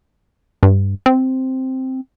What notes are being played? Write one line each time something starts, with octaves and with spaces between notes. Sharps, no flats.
G2
C4